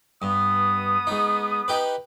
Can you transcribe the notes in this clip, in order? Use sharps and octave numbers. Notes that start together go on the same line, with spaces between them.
G2 B3 D#6
G#2 D#4
D#4 G4 B4